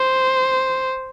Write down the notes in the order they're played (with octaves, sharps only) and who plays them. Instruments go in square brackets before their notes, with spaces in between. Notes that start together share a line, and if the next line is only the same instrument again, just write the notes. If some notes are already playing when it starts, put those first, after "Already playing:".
Already playing: [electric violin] C5